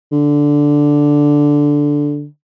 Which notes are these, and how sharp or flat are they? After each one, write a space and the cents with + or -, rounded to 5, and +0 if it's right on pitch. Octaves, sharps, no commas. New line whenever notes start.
D3 -5